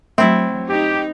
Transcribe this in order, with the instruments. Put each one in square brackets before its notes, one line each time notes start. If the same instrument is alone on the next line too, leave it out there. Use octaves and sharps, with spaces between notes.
[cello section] F#3 [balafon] A3 [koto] C4 E4
[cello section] D#4 [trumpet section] G4